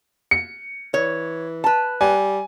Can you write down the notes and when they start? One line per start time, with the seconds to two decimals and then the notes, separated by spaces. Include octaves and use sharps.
0.31 C#7
0.94 E3 C#5
1.64 B4 A5
2.01 G3 G#5